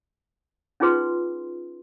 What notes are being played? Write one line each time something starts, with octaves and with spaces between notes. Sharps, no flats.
C#4 D#4 F4 G#4 B4 C6